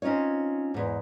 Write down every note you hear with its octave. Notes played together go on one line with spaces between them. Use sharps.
C4 C#4 D#4 F4 C#5
E2 G#2